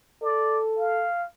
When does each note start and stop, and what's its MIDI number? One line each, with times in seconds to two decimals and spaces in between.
0.23 1.06 69
0.23 0.60 74
0.79 1.24 77